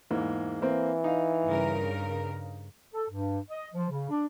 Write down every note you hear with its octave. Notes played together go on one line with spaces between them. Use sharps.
E2 G#2 A#3
E3 A#3 C4
D#4 F5
G2 C#3 A#4
A4
G2
D#5
F3
C#3
D4